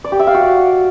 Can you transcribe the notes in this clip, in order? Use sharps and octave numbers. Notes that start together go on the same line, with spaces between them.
D5
G4
E5
F5
F#4